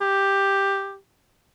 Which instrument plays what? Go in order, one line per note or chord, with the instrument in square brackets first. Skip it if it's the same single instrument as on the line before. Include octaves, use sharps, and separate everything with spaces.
[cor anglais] G4